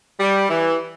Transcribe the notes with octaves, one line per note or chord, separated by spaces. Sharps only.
G3
E3